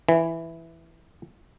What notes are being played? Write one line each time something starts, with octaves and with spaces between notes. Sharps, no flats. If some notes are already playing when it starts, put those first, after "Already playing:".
E3